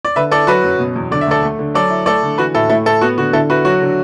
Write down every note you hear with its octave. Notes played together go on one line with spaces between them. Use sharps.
D5
D3 B4 E5
E4 A4 D5
F#3 F#4 B4
F#2
B2
E2
D3 D5
E5
D2 A4 D5
A3
D3
F#3 A4 D5
E4
A3 A4 D5
D3
E3 F#4 B4
A2 E4 A4
A3 E4 A4
A2 E4 A4
B3 F#4
D3 F#4
D3 E4 A4
E4 F#4 B4
F#3 F#4
D3